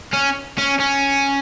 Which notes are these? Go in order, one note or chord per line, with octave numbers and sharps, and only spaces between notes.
C#4
C#4
C#4